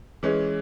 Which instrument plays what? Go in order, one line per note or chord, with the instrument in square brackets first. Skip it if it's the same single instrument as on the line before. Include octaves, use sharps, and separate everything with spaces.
[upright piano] E3 G#3 C#4 [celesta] G#4